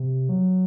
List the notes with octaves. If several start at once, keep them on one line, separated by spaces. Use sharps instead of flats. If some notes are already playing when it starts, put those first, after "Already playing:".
Already playing: C3
F#3